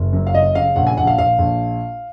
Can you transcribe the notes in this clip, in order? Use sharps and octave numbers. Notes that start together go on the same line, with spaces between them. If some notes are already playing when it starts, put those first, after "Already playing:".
Already playing: F#1
F#2
F5
C#3 D#5
C#3 F5
A#1 F#5
G#5
A#1 F#5
F5
A#1 F5
A#1